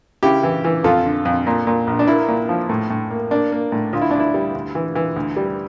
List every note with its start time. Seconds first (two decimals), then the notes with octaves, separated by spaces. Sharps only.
0.23 C#3 E4 G4
0.43 E3
0.64 E3
0.84 F2 F4 A4
1.05 D3
1.25 F2
1.47 A#2
1.67 A#2
1.87 A#1
1.99 D4
2.07 A#3 E4
2.28 A#2
2.49 F3
2.69 A2
2.90 A2
3.11 A#3
3.31 A#3 D4
3.52 A#3
3.72 A2
3.93 D2 F4
4.02 E4
4.11 D2 D4
4.20 E4
4.34 G3
4.55 D2
4.75 E3
4.95 E3
5.16 D2
5.36 G3